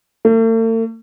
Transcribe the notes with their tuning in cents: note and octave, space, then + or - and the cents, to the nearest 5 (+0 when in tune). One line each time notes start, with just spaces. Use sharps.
A3 +45